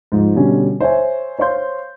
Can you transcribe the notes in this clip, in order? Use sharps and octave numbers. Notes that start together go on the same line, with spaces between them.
G#2 F3
B2 D3 G3 C#4
C5 C#5 E5 G#5
C5 C#5 F5 C6 G6